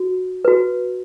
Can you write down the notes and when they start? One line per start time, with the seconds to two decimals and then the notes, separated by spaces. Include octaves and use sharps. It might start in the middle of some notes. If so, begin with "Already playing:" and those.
Already playing: F#4
0.45 F#4 B4